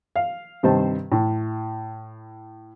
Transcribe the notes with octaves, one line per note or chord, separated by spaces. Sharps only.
F5
G2 C3 D#3 C5 A5
A2